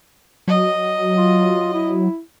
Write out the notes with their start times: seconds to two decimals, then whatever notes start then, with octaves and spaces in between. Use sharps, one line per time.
0.48 F#3 D#5
1.17 F4
1.74 E4